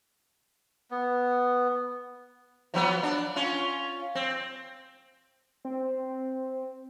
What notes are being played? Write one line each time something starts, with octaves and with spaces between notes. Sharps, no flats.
B3
F3 F#3 B3
D4
C#4 F4
C4
C4